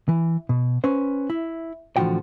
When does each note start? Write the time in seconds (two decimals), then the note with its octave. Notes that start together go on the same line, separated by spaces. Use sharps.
0.09 E3
0.49 B2
0.84 C#4 B4 C5
1.30 E4
1.97 A2 D3 E3 F3 F#4 G5